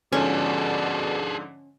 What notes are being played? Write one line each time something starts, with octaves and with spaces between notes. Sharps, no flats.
G#2 B2 D3 F3 C#4 G#4 A4 D5